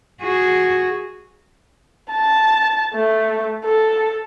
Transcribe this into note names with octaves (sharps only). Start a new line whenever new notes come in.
F#4 G#4
A5
A3
A4